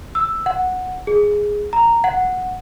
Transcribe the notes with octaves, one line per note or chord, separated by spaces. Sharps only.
E6
F#5
G#4
A#5
F#5